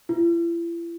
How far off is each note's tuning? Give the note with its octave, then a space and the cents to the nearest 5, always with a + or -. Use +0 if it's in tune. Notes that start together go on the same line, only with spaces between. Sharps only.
E4 +40